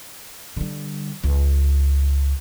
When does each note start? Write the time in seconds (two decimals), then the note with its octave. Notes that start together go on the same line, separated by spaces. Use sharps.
0.57 D3 G3
1.24 C#2